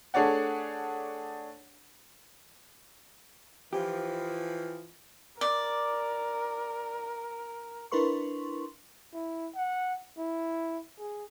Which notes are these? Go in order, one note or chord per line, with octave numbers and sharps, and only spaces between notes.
A3 D4 G#4 C#5 D5 F#5
E3 F3 G4
A#4 D5
D4 E4 A#4 B4 C6 C#6
E4
F#5
E4
G#4